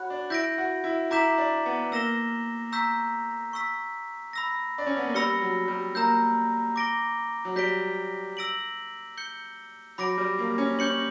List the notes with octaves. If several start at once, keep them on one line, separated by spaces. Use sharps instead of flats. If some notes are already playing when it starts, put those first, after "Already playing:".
Already playing: F#4 C#5 B5 F#6
D4
E4 G6 A#6 D7
F#4
E4
E4 A#5 D6 G6 B6 E7
D4
B3
A#3 E6 A#6 E7 G7
A#5 C#6 E6 G6 B6
C#6 E6 B6
B5 E6 A#6
D4
C#4
B3
A#3
G3 B5 E6 A#6 C#7 G7
F#3
G3
A#3 A#5 E6 G6
D6 A#6 D7 G7
F#3
G3 G6 B6 D7 G7
E6 A#6 D7 F#7
G6 C#7 G7
F#3 B5 D6 A#6 D7
G3
A#3
C#4
C#4 C#6 G6 C#7 F#7